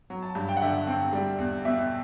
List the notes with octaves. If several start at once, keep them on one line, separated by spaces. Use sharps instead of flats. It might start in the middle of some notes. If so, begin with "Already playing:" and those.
F#3
A5
G2
G5
F#5
D3 E5
C4
G3
E2
B2 E5